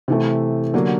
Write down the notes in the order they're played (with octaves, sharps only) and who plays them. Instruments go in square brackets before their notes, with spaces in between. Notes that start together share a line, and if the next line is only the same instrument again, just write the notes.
[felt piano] C3 E3 A3
D3 F#3 A#3 D4 G4